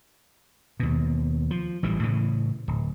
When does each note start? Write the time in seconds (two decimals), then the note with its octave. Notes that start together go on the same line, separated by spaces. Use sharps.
0.80 D#2 B2
1.51 F3
1.83 A1 A2 E3 G3
2.03 A2 C#3 E3
2.68 D1